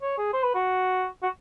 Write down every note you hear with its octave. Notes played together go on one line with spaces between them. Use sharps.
C#5
G#4
C5
B4
F#4
F#4